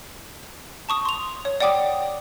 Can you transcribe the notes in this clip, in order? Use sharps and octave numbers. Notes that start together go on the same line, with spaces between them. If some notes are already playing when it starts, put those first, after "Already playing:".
A5 C#6 D#6
C6 F7
C#5
D5 F#5 G5 D6 D#6